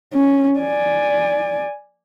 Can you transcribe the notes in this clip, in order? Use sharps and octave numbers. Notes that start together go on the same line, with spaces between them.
C#4
D5 G#5